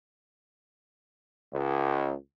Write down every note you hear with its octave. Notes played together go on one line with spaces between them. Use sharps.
C#2